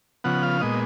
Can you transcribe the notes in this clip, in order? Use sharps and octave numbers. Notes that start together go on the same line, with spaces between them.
C#3 F3 B3 F#5
F5
A#2 G#3 B3 D#5